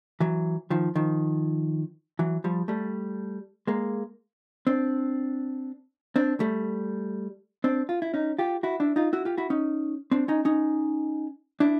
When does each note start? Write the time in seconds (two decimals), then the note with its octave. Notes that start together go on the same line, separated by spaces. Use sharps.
0.20 E3 F#3
0.70 D#3 F3
0.95 D#3 F3
2.19 E3 F#3
2.44 F3 G3
2.68 G3 A3
3.67 G#3 A#3
4.67 C4 D4
6.16 C4 D4
6.40 G3 A3
7.64 C4 D4
7.89 F4
8.02 E4
8.14 C#4 D#4
8.38 F4 G4
8.63 E4 F#4
8.80 D4 E4
8.96 D#4 F4
9.13 E4 F#4
9.25 F4 G4
9.38 E4 F#4
9.50 C#4 D#4
10.11 C4 D4
10.28 C#4 D#4
10.45 C#4 D#4
11.60 D4 E4